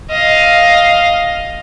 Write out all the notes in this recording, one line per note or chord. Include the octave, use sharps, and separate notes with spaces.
D#5 F5